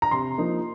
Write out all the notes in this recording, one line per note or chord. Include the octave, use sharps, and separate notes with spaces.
A#5
C3 C6
F3 A#3 D#4